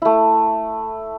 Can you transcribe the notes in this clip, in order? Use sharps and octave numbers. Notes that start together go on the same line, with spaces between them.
A3 E4